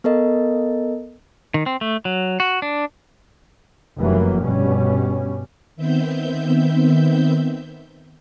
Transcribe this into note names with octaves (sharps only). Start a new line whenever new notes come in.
B3 A4 A#4 D#5
D#3
C4
A3
F#3
F#4
D4
F1 F#2 E3 F#3 A#3
G2 B2 G3 C#4
D#3 B3 C4 E5 G6